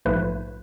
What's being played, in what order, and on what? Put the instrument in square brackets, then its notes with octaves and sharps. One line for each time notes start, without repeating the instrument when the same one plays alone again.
[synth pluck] A#1 G#2 F3 A3 B4